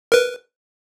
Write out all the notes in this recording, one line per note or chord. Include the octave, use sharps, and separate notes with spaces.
A#4 B4